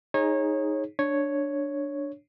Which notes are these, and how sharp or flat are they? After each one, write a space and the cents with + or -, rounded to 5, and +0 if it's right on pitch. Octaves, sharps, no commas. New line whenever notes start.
D#4 +0 G#4 +0 C#5 -25
D4 +0 C#5 +0